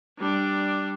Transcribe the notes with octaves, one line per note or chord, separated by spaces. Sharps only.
G3 D4